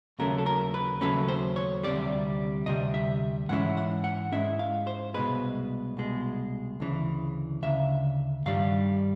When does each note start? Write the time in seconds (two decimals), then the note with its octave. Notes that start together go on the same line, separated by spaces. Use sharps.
0.19 D#2 C#3 F#3 A3 C#4 A#4
0.38 A4
0.46 A#4
0.74 B4
1.01 D#2 C#3 F#3 A3 C#4 B4
1.28 C5
1.56 C#5
1.83 D2 C3 D#3 G3 D5
2.66 D2 C3 G3 D#5
2.94 E5
3.49 G#2 E3 G#3 C#4 E4 F#5
3.77 F#5
4.04 F#5
4.32 G#2 E3 G#3 C#4 E4 E5
4.59 F5
4.87 C5
5.14 C2 B2 G#3 B4
5.97 C2 B2 G#3
6.80 D2 C#3 E3
7.62 D2 C#3 E5
8.46 G2 D#3 G3 F5